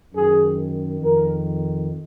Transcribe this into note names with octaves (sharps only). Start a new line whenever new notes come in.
F#2 D#3 G#4
F2 D#3 A#4